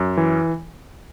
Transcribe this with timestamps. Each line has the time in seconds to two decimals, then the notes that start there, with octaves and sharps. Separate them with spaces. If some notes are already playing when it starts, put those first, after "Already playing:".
Already playing: F#2
0.17 E3